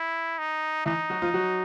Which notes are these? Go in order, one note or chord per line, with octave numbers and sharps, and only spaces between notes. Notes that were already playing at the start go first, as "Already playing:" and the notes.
Already playing: E4
D#4
E3 D#4 E4
F#3 F#4
F3 F4
F#3 F#4